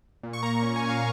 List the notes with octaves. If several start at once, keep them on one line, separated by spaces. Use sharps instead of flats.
A#2
C#6
A#3 A#5
C#4 A#5
G#5
A#2
F5